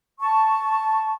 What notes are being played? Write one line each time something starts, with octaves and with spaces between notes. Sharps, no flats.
A5 C#6